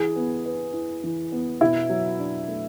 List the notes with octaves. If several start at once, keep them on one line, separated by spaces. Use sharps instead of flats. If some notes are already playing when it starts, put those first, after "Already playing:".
Already playing: E3 G#4
B3
B4
E4
E3
B3
B2 E4
F#3
D4
A3